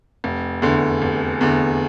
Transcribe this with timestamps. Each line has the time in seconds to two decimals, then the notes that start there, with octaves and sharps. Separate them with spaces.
0.24 F1
0.62 E2 D3
1.02 F1
1.41 E2 D3